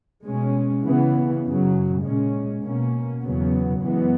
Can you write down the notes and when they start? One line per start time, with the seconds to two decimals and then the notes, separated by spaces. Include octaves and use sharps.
0.24 B2 G#3 C#4
0.83 C#3 E3 B3
1.44 F#2 C#3 F#3
2.03 A#2 G#3 C#4
2.63 B2 A#3 C#4
3.23 E2 C#3 F#3 B3
3.82 F#2 E3 G#3 B3